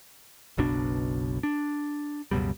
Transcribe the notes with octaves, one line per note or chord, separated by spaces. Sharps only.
F#1 B1 B2 D4
D4
C#2 F#2 B2 G3